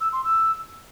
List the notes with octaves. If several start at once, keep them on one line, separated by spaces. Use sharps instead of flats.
E6
C6
E6